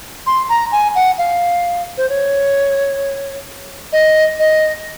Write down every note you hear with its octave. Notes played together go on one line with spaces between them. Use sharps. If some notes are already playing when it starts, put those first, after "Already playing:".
C6
A#5
G#5
F#5
F5
C5
C#5
D#5
D#5